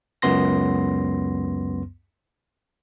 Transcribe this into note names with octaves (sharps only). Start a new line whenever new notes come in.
C#2 F#2 B3 C6 A#6